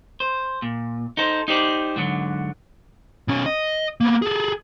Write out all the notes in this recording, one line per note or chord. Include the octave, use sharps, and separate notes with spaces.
C5
A#2
D#4 A4 C5
D#4 G4 C5 D5
G#2 D3 F#3
B2 C#4
D#5
A#3 B3
G#4 A4